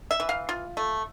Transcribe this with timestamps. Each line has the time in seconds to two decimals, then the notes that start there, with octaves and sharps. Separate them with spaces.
0.11 E5
0.20 E3
0.29 F5
0.49 F4
0.77 A3